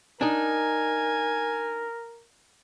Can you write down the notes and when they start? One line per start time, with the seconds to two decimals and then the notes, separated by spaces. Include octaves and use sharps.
0.21 D4 D#4 A#4 G#5